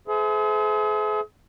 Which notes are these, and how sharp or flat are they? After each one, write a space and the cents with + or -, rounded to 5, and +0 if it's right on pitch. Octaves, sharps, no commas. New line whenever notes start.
G#4 +40 C5 -35 E5 +0